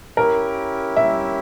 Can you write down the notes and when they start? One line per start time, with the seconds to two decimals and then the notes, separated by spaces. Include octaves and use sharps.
0.17 C#4 E4 G4 A#4
0.97 E5